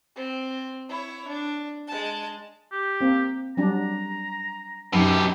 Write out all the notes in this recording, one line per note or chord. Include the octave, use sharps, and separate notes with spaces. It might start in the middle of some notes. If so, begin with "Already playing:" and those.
C4
E4 C#5
D4
G#3 A5
G4
A#3 C4
F#3 G3 D4 A#5
F#2 B2 D#4 G4